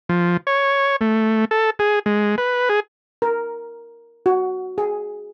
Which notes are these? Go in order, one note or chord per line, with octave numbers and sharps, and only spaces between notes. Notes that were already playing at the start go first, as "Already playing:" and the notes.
F3
C#5
A3
A4
G#4
G#3
B4
G#4
A#4
F#4
G#4